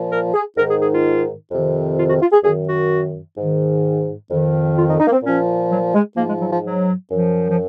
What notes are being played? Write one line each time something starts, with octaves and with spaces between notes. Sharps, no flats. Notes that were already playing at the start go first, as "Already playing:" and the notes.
Already playing: A#2 F3
A#4
G#4
G#2 D#3 A#4
G#4
G#4
F4
F2 C3 D#3
F4
F#4
F4
G#4
F#2 D#3 G#4
F#4
G#2 D#3
F2 D#3
F4
D#4
D#4
A#3
C4
A#2 F3 C#4
F#3
G#3
G#2 F3 A#3
G#3
F#3
F3
F#3
F#2 F3
F3